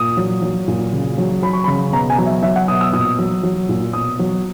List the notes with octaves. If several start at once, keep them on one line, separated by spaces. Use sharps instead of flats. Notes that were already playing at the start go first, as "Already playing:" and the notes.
Already playing: A#2 D#6
F#3
F#3
A#2
C#3
F#3
F#3 B5
C#6
C#3 B5
B2 A#5
G#5
F#3
E5
F#3 E5
F#5
B2 D#6
E6
A#2 D#6
F#3
F#3
A#2
B2 D#6
F#3